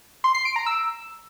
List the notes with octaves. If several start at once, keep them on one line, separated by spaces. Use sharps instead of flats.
C6
C7
D7
A#5
E6